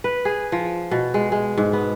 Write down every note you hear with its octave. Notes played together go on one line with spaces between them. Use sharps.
B4
G#4
F3
B2
G#3
G#3
G#2
B3